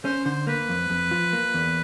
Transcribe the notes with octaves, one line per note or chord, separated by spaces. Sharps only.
C#4 C5
D3 C5
A#3 B4
F2
F2
F3
A#3
E2